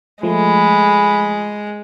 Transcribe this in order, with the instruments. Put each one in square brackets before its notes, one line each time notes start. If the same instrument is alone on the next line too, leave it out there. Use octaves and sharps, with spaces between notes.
[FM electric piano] F3 A3 [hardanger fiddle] G#3 [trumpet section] B5